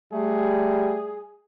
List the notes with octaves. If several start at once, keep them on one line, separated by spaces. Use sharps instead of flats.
G3 A3 G#4